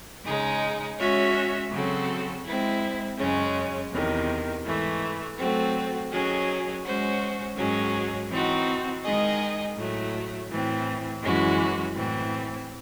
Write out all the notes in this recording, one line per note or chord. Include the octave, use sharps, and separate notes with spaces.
C#3 G#3 D#4
G#3 C#4 F#4 C#5 E5
C#3 F#3 C4 F#4 A4
G#3 C4 E4
F#2 C#3 G#3 C#4
E2 C3 D#3
G#2 E3 A3
F#3 A3 C4 F#4
D#3 F#3 C#4 G#4
G#3 C#4 F#4 C5
G#2 D#3 F#3 C#4 G#4
E3 C4 D#4 F#4
D#3 G#3 D#4 G#4 D#5
A2 F#3 A3
A2 E3 C4
F#2 E3 G#3 C#4 F#4
A2 E3 C4